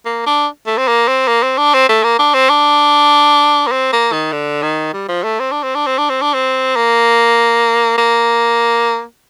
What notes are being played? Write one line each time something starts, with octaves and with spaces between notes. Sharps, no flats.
A#3
D4
A3
C4
A#3
C4
A#3
C4
D4
C4
A3
A#3
D4
C4
D4
A#3
C4
A#3
D#3
D3
D#3
G3
F3
A3
C4
D4
C4
D4
C4
D4
C4
D4
C4
A#3
A#3